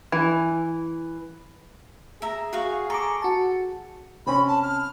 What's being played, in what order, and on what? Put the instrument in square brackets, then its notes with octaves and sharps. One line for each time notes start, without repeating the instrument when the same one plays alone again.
[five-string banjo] E3
[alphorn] G#4 [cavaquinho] E5 A#5
[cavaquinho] F#4 F5 C#6
[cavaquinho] A4 [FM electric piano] A#5 C#6 D6
[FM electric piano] F#4 A5
[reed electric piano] C3 C4 C#4 [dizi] B5
[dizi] A5
F6